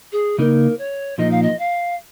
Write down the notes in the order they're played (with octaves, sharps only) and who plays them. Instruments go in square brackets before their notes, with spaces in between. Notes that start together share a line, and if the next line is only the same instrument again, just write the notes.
[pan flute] G#4
[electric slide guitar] C#3 A#3 D#4 [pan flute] A#4
[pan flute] C#5
[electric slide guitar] A#2 F3 A#3 D#4 [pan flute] D#5
[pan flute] F5
D#5
F5